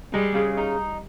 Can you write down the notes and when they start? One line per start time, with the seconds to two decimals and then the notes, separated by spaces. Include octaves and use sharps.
0.13 G3 G#3
0.34 C#3
0.57 D#4